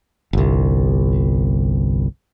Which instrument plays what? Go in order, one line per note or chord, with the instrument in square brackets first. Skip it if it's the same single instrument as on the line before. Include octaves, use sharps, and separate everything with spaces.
[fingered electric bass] G1 C2